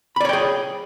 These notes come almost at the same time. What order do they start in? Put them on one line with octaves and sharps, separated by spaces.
B5 D5 C#5 G5 G#4